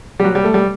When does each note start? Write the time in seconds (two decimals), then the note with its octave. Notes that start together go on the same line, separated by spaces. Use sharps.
0.20 G3
0.24 F#3
0.35 G3
0.44 A3
0.54 G3